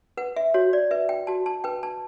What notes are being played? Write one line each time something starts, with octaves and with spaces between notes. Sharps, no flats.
B4 F#5
E5
F#4 C#5
D5
B4 E5
G5
F#4 A5
A5
B4 G5
A5